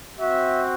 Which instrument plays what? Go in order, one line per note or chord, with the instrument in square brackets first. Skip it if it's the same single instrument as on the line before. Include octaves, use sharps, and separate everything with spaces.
[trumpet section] C4 F#4 E5